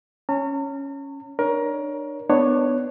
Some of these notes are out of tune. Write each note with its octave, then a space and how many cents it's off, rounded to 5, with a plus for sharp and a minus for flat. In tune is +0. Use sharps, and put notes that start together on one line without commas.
C#4 +0 A#5 -45
D4 +30 A#4 +20 C#5 +15
B3 +15 D4 +20 C#5 +0